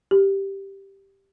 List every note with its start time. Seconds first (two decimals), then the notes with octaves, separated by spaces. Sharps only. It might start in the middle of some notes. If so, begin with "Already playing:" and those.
0.11 G4